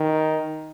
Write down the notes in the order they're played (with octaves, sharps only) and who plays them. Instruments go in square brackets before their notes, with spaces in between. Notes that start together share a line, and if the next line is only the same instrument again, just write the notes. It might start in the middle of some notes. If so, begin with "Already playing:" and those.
Already playing: [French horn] D#3